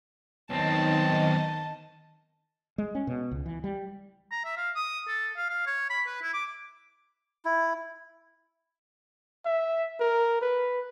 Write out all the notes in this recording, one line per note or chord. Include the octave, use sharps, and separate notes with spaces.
B1 D#3 C4 D#5 A5
G#3
C#4
B2
C#2
E3
G3
A#5
E5
F5
D#6
A4
F5
F5
C#5
B5
B4
E4
D6
E4
E5
A#4
B4